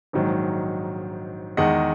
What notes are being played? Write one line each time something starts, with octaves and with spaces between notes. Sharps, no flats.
A#1 G#2 D#3 F#3
E2 D#3 G#3 D#5 F#5